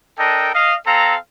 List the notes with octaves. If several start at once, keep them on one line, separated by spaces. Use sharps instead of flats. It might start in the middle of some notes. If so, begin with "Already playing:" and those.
D4 A4 A#4 D#5 G5
D#5 F5
C4 A4 F5 A#5